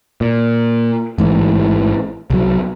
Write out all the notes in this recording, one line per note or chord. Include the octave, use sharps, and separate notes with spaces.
A#2
A1 G#2 E3
C2 F#3